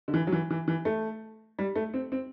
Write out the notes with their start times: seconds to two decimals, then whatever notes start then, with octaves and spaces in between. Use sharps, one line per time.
0.08 D3
0.14 E3
0.27 F#3
0.32 E3
0.50 E3
0.68 E3
0.85 A3
1.59 G3
1.76 A3
1.94 C4
2.12 C4